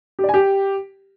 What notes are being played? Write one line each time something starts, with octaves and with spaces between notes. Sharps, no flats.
G4
D5
G#5
G4